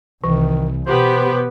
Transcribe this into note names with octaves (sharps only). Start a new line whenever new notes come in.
C2 D#3 E3
B2 B3 G4 B4 C5